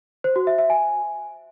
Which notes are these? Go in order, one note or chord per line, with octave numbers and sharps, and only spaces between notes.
C5
F#4
E5
E5
G#5